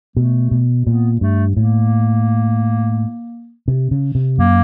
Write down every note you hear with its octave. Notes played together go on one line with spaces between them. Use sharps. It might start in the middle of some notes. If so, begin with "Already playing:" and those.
B2 A3
B2
A#2 B3
G2 A3
A2 A#3
C3
C#3
C3
F#2 A#3